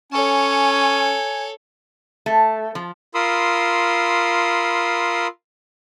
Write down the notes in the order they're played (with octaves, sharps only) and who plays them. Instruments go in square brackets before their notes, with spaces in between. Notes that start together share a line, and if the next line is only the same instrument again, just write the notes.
[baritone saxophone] C#4 [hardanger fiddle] A4 C#5 [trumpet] G#5
[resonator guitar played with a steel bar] A3
F3
[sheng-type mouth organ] F4 A#4 B5 C6 D#6 E6